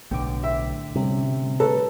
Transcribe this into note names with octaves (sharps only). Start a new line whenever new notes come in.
B1 A2 D3 G5 D6
E5
C3 G3 C#4
A4 B4 C#5 A#5